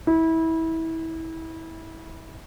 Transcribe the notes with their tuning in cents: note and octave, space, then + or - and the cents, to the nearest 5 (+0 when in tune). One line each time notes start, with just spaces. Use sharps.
E4 -25